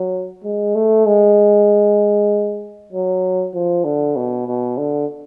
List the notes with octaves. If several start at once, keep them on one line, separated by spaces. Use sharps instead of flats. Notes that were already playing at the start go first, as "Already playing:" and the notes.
Already playing: F#3
G#3
A3
G#3
F#3
F3
D3
B2
B2
D3